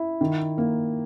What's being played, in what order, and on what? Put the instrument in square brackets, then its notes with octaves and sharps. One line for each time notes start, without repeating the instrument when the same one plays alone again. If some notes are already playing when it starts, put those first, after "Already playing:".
Already playing: [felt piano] E4
D#3
A#3